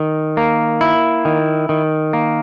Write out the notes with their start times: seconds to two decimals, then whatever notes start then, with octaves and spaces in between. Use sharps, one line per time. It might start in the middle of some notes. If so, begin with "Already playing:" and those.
Already playing: D#3
0.37 A#3
0.81 E4
1.25 D#3
1.69 D#3
2.13 A#3